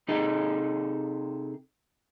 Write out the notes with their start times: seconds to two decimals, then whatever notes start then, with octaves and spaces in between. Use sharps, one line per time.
0.08 C3 D#4 G#4 A4 D#5